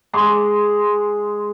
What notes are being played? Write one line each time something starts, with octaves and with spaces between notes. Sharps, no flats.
G#3 C6 D6